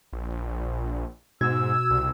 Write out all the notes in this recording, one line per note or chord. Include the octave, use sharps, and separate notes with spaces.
A#1
G#2 B2 F#4 E6 G#6
C2